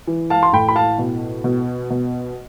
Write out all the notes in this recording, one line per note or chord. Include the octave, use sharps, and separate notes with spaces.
E3
F5 A5
C6
A2 G5 B5
B5
F5 A5
B2
B2
B2